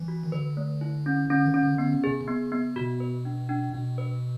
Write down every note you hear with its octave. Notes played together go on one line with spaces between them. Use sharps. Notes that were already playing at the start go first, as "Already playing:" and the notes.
Already playing: E3
F#4
D#3
D3 B4
A3
E4
C#4
D3 C#4
D#3
C#4
D3
D3 B3
C#3
C3 G#4
C#3
B3
B3
B2 F#4
B4
D4
D4
B2 D4
B4